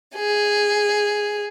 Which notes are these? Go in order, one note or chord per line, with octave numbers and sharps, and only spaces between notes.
G#4